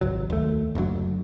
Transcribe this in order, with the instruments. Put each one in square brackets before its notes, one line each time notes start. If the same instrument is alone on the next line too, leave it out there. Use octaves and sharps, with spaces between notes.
[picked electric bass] G#1 C#2 F#3
D#2 A3
F#1 D2 B2 F#3